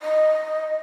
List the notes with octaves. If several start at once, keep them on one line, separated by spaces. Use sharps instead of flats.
D#5